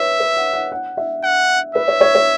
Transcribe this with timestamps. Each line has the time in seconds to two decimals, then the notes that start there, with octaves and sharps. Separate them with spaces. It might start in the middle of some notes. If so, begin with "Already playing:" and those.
Already playing: B4 C#5 E5
0.20 B4
0.37 F#5
0.53 F#5
0.72 F#5
0.97 E5
1.24 F#5
1.75 B4 E5
1.88 C#5
2.01 C#5
2.15 C#5